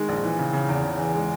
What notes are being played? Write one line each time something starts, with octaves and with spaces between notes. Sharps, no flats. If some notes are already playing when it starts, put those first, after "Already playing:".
Already playing: D#3 G#3
A#1
E3
C#3
C#3
E2
C#3
E3
G#3